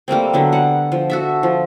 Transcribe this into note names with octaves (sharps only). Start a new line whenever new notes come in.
G3 A3 A#3 C4
D3 F#3 B3
G3 F#5
F3
F#4 A4 E5
F3